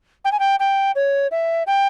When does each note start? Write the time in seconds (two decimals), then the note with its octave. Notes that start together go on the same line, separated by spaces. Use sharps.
0.25 G5
0.32 G#5
0.39 G5
0.60 G5
0.95 C#5
1.31 E5
1.67 G5